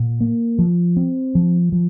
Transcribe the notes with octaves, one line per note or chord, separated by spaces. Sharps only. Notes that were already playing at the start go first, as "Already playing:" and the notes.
Already playing: A#2
A#3
F3
C4
F3
F3